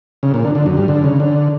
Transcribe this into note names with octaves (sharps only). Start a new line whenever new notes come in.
C#3
A#2
D3
D3
F#2
G2
D3
C#3
D3